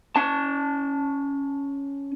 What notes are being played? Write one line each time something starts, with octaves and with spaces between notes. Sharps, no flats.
C#4 A5